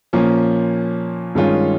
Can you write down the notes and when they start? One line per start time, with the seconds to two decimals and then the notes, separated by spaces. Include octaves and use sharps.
0.13 A#2 F3 A#3 C#4
1.35 G2 D#3 G#3 C#4 F4